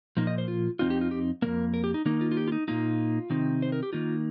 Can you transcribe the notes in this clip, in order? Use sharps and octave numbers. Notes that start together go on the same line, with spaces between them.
A#2 F3 A#3 D#4
D#5
C5
F4
F2 D#3 C4 D#4 F4
G4
F4
G4
F2 D#3 A#3 A#4
A#4
G4
D#4
D#3 A#3 D#4
F4
F4
G4
F4
D#4
A#2 A#3 D#4 F4
C3 D#3 C4 D#4
C5
A#4
G4
D#3 A#3 D#4 F4